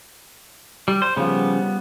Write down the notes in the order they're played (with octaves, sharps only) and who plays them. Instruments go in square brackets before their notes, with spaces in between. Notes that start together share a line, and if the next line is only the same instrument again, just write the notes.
[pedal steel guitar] G3
C5
[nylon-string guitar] C#3 F3 [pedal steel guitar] G3 B3